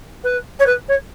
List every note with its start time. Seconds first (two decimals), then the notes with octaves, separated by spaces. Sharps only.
0.24 B4
0.59 C#5
0.66 B4
0.88 C#5